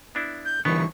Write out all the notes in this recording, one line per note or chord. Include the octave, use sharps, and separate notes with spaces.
B3 D4 E4
G6
A#1 D3 E3 G3 B3 C#6